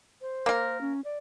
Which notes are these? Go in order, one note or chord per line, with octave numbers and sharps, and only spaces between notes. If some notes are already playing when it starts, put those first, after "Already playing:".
C5
A#3 A#4
C#4
D5